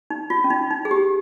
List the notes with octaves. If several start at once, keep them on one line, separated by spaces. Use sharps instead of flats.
D#4
F4
C#4
D#4
D#4
G#4
G4